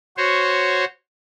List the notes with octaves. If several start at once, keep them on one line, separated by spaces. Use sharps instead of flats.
F#4 C5 C#5